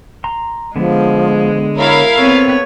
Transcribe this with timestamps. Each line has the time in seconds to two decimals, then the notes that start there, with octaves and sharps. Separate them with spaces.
0.24 A#5 C6
0.76 D3 F3 G#3 B3
1.77 E4 A#4 C#5 F5
2.18 B3 C4 A4 B4 C#5